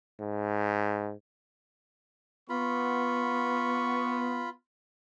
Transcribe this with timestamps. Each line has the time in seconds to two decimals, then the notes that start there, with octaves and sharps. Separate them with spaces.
0.21 G#2
2.49 B3 F4 B5 C#6